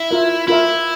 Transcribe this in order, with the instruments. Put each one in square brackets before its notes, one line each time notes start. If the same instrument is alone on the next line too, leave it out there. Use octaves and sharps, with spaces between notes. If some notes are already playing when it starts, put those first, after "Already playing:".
Already playing: [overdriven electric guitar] E4
[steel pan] F4 A#4 E5
[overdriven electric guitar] E4 [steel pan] F4 A#4 E5